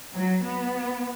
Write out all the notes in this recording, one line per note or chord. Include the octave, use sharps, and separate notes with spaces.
F#3
B3